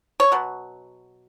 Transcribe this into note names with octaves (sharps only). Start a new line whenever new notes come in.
C#5
B2 F#3